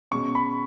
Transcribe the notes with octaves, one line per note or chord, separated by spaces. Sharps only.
B2 G#3 C#4 C#6
B5